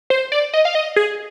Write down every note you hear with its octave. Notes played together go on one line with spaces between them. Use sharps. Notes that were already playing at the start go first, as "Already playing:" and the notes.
C5
D5
D#5
F5
D#5
G#4